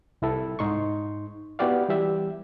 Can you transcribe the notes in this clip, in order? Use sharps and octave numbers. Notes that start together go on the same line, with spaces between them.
C2 E4 A4
G#2 D#4 C6 C#6
B3 E4 F#4 G4 D5 F5
E3 G3 G4 E5